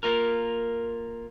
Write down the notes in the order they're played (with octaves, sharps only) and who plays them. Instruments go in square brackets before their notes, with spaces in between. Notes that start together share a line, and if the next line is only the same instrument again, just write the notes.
[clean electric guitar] A#3 F4 A#4